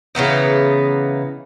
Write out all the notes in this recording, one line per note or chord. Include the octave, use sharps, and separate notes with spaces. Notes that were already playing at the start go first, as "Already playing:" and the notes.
C#3 E3 B3 D#4